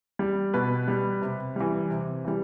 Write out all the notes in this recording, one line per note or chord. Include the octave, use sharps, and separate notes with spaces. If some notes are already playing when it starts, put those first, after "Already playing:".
G3
B2 B4
G3
C3
E3 G3
C3
E3 G3